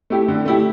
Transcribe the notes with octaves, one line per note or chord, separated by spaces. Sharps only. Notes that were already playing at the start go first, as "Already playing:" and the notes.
A3 E4 G4
D3
A3 E4 G4